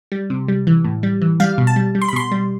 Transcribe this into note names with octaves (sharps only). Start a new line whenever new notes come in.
G3
C3
G3
E3
A2
G3
E3
G3 F5
B2
A5
G3
G3
C6
B5
B2 C6
G3